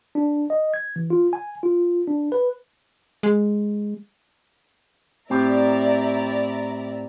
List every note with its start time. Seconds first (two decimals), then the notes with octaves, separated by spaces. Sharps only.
0.15 D4
0.50 D#5
0.74 G#6
0.96 E3
1.10 F4
1.33 G#5
1.63 F4
2.08 D4
2.32 B4
3.23 G#3
5.30 A2 C4 G4 D5 E5 A#5